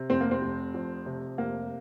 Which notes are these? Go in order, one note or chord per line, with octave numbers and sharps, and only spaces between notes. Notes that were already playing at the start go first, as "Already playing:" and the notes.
Already playing: C3
F1 C4
A#3
C4
F1
F2
C3
F1 A#3